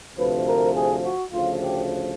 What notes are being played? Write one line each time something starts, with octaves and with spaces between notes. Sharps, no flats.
D2 C3 F3 B4
A#4
G#4
F#4
D2 C#3 F3 F4
G4